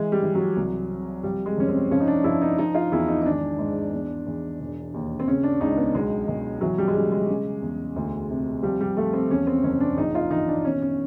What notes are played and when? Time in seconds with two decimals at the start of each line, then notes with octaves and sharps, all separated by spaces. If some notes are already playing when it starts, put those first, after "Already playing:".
Already playing: E3 G#3
0.12 G3
0.23 E3
0.35 F#3
0.57 C2
0.90 C3
1.23 F3 G3
1.46 G#3
1.57 F1 C#4
1.68 C4
1.91 F3 C#4
2.00 D#4
2.08 D4
2.24 F3 E4
2.41 D#4
2.58 F3 D#4
2.75 F4
2.91 E2 E4
3.08 D#4
3.22 D#4
3.26 G#1 D4
3.59 G#2
3.93 E2
4.26 E2
4.60 E1
4.94 D#2
5.20 C4
5.27 C#3 C#4
5.43 D4
5.61 C#2 D#4
5.78 B3
5.95 B1 G#3
6.28 B1
6.61 E3 F#3
6.78 G3
6.88 G#3
6.95 C#3 G3
7.12 G#3
7.29 C#3
7.62 E2
7.96 D2
8.30 C3
8.63 F3 G3
8.81 G3
8.97 F3 A3
9.13 C4
9.30 E2 C#4
9.47 C4
9.63 F#1 C#4
9.80 D4
9.98 A#1 D#4
10.15 F4
10.31 E3 D#4
10.48 D4
10.64 B2 C#4
10.82 C#4